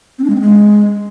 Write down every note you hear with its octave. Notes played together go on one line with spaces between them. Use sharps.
C4
D4
G#3
C4
G#3